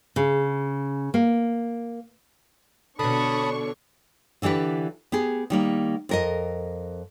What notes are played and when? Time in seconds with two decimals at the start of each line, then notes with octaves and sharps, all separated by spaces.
0.16 C#3
1.14 A#3
2.99 B2 D3 D4 C#5 A5 B5 C#6 D#6
4.42 D3 E3 D4 G4 B4
5.12 B3 G4 G#4
5.50 D#3 G3 A#3
6.09 F2 A#4 D#5